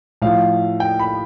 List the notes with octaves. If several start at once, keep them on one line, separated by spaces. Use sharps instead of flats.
A2 F3 F5
G5
B5